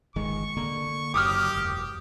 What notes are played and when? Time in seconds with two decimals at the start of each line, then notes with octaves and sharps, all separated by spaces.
0.16 G1 D#3 G#3 C#6
0.57 D3 A#3
1.14 F#1 F#2 F#3 G4 D6 D#6 F6
1.56 E1